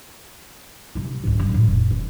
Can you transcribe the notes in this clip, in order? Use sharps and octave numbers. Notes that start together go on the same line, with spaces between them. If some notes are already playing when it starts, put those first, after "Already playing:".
C3 A#3
C#2 G#2
G2
A2 A3
F1
D#2 B3